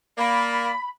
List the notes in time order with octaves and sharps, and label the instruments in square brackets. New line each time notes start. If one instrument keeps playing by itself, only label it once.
[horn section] A#3 D5 [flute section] B5